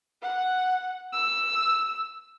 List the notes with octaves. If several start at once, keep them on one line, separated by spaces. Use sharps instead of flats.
F#5
E6